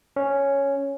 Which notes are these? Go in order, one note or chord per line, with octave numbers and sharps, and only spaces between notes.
C#4